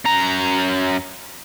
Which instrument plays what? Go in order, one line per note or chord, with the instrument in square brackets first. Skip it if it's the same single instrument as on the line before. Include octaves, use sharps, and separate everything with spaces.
[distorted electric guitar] F#2 A#5